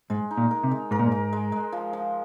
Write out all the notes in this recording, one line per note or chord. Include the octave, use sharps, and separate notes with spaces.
G#2 G#3
D#4
A#2
A#4
C3
G#3
G#2 A#4
A#2
G#2
A#4
G#3
G#3
F3
F3